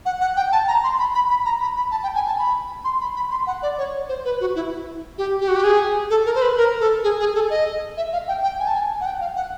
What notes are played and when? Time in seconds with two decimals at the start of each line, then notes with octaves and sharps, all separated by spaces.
0.06 F#5
0.21 F#5
0.37 G5
0.52 A5
0.68 A#5
0.84 C6
0.99 B5
1.15 B5
1.30 B5
1.45 A#5
1.61 B5
1.76 B5
1.91 A5
2.03 G5
2.15 G#5
2.27 A5
2.38 B5
2.85 C6
3.01 B5
3.16 B5
3.31 C6
3.47 F#5
3.62 D5
3.78 C#5
4.09 C5
4.25 B4
4.41 F#4
4.55 E4
5.18 G4
5.41 G4
5.48 F#4
5.56 G4
5.64 G#4
6.10 A4
6.26 A#4
6.35 C5
6.42 B4
6.57 A#4
6.80 A4
7.04 G#4
7.20 G#4
7.35 A4
7.50 D#5
7.97 E5
8.13 F5
8.28 G5
8.43 G5
8.60 G#5
8.67 A5
8.74 G#5
9.01 F#5
9.06 G5
9.21 F5
9.36 F#5